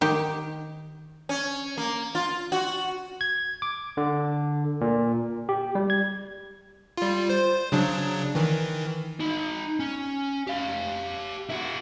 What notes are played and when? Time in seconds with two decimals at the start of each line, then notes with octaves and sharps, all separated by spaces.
0.01 D#3 G4
1.29 C#4
1.77 A#3
2.15 F4
2.52 F#4
3.21 G#6
3.62 D6
3.97 D3
4.81 A#2
5.49 G4
5.75 G3
5.90 G#6
6.97 G3 F4
7.30 C5
7.72 C#3 F#3 D4
8.35 D#3 E3
9.20 D#4 B5
9.80 C#4
10.47 G4 F5
11.49 E4 F#4